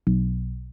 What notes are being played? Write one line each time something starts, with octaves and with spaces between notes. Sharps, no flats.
B1